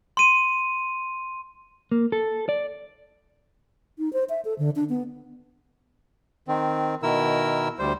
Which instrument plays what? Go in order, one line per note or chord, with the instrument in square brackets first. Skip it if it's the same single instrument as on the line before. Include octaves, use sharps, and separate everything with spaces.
[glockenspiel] C6 D#7
[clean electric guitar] A#3
A4
D5
[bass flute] D#4
C5
E5
A4
D3
D4
B3
[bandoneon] D#3 C4
B2 D#3 E4 A#4 E6
D2 G3 C5